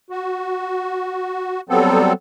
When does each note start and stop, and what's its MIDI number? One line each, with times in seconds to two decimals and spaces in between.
0.10 1.61 66
1.70 2.13 54
1.70 2.13 55
1.70 2.13 59
1.70 2.13 60
1.70 2.13 69